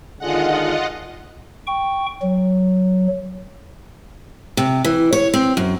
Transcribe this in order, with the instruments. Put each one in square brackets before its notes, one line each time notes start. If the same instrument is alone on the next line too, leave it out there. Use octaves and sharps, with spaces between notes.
[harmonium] D#2 D3 G#3 [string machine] F4 D#5 F#5
[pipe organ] G5 C#6
F#3
[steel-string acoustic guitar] C3
E3
C#5
C4
F#2